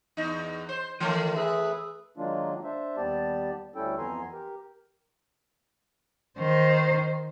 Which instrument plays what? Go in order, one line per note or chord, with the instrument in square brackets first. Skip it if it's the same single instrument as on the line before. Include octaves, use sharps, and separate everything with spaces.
[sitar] E2 D#4
C5
[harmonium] D#3 [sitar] E3 A3
[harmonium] G#4 B4 E5
[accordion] D#3 F#3 G#3 A#3 D4 F4
D4 C5 E5
D#2 G3 B3 G4 D5 A5
D2 G3 C#4 E4 A4 G5
F2 E3 B3 G#5 A#5 C6
G4 A#4
[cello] D#3 C5